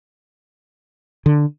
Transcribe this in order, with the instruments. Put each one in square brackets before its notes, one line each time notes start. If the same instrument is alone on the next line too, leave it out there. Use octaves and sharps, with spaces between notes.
[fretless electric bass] D3